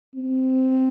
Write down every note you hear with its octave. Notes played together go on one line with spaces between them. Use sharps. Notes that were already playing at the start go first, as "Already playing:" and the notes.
C4